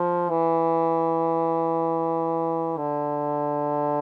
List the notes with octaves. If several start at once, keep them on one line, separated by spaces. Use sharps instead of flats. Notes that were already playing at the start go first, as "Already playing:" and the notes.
Already playing: F3
E3
D3